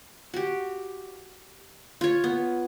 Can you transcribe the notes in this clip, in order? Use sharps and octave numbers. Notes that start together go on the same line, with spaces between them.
F#4 G4
F4 C#5
B3